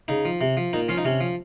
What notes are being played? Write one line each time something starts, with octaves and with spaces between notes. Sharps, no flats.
C#3 D#4
F3
C3
F3
A#2 D#4
F3 C#4 F4
D#4
C3 C#4
F3